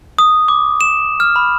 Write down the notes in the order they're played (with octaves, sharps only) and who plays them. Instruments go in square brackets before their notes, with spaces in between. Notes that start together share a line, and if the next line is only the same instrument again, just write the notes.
[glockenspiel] D#6
D6
E7
F6
B5